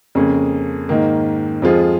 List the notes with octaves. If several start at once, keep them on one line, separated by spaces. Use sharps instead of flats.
F2 C#3 A#3 C#4 G#4
G#2 D#3 A#3
F2 F3 G#3 F4 G#4